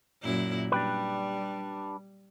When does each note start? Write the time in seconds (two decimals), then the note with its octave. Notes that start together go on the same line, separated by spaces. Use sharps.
0.22 F#2 A#2 E4
0.72 G3 D4 G4 B4